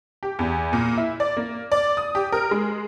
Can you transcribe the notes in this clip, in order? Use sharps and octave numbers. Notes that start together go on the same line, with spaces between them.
G4
E2
A#2
E4
D5
A#3
D5
D#6
G4
A#4
G#3